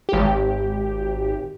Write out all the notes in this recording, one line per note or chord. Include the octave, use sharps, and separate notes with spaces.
G#1 G4